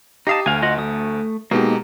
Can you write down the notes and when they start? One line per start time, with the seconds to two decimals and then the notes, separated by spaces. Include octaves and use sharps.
0.27 D#4 G4 F5 A5 D#6
0.46 D2 F5 G#5
0.62 F4 D#5 F#5
0.78 A3 D#6
1.51 B2 G#3 A#3 D#4 G4